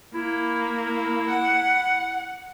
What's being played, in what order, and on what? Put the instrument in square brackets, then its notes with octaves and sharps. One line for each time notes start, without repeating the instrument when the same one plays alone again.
[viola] A#3 [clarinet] E4
[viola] F#5